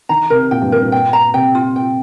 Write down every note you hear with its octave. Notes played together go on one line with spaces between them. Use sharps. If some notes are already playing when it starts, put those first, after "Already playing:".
D#3 A#5
C3 A#4
A#2 G5
G2
G2 A#4
A#2
G5
A#5
C3 G5
F4
G5